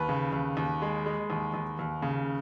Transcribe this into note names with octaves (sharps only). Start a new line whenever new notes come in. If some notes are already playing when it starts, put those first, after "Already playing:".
Already playing: D#2 B4
C#3
D#2
D#2
G#3
G#3
D#2
D#2
D#2
C#3